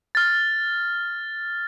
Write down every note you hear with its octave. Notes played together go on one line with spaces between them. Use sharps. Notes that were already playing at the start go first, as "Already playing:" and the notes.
F6 A6